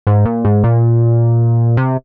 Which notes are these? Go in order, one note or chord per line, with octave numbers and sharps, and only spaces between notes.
G#2
A#2
G#2
A#2
C3